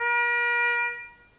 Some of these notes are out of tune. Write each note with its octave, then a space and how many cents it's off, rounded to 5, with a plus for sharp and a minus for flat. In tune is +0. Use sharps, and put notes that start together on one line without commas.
A#4 +40